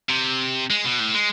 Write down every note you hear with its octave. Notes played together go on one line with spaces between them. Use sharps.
C3
G#3
B2
A2
G#3